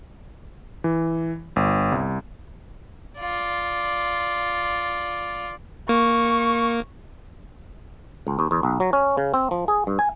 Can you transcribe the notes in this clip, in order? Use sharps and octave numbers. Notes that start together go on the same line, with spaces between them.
E3
G1
C2
F4 D5
A#3 C#6
C#2
D#2
E2
B1
F#3
C#4
C#3
C4
F3
G#4
G2
G#5